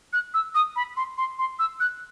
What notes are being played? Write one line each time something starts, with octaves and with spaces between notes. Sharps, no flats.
F#6
E6
D#6
B5
C6
C6
C6
E6
F#6